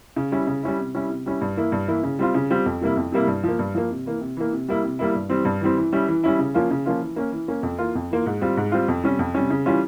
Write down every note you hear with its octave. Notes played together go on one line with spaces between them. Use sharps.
C#3
G3 C#4 E4
C#3
G3 C#4 E4
C3
G3 C#4 E4
C3
G3 C#4 E4
G2
E3 A#3 E4
G2
E3 A#3 E4
C#3
G3 C4 F4
C#3
G3 C4 F4
F2
C3 G3 A#3 E4
F2
C3 G3 A#3 E4
G2
F3 A#3
G2
F3 A#3
C3
E3 A#3
C3
E3 A#3
C3
G3 A#3 E4
C3
G3 A#3 E4
G2
E3 G3 C4
G2
E3 G3 C4
E3
G3 C#4 E4
E3
G3 C#4 E4
C#3
F3 A#3 C#4 F4
C#3
F3 A#3 C#4 F4
E3
A#3 C#4
E3
A#3 C#4
F2
E3 A#3 F4
F2
E3 A#3 F4
G#2
G3 C4 F4
G#2
G3 C4 F4
F2
C3 G3 C#4
F2
C3 G3 C#4
C#3
E3 G3 C#4 F4